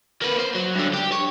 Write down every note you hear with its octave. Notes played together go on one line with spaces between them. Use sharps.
A#3 B4
C5
F#3
G2 D3
G4
C#5